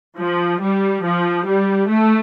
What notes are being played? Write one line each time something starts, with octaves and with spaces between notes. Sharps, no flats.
F3
G3
F3
G3
A3